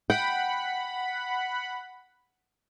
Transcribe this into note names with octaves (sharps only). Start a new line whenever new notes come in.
F#5 G5 B5